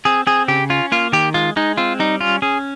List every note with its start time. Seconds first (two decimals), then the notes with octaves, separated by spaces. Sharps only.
0.05 C4 G#4
0.27 C4 G#4
0.48 C#3 G4
0.70 C#4 F4
0.92 A#3 F4
1.13 D#3 G4
1.34 G#3 F4
1.56 G#3 D#4
1.77 C4 F4
1.99 G3 D#4
2.21 C#4 F4
2.42 C#4 G#4